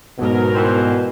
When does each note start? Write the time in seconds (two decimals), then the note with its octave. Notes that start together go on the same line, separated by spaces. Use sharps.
0.19 G#2 B2 F#3 B3 A#4
0.55 E3 G3 C5